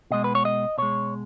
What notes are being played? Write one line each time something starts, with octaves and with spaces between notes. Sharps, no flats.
B2 G#3 D#5
B4
C#5
D#5
B2 G#3 C#5